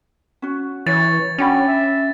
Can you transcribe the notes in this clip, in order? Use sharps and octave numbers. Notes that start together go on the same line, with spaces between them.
C#4 F#4
E3 C#5 A6
C#4 D4 F#4 G5 B5
E5